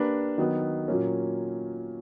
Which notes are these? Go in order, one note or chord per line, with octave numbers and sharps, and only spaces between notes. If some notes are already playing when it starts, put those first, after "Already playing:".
Already playing: A#3 D4 G4 B4
D#3 F#3 B3
A#2 F#3 A#3 C#4